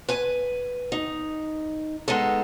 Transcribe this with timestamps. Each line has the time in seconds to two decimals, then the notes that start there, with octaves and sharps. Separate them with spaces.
0.09 B4 G#5
0.92 D#4
2.08 G#3 B3 D#4 A4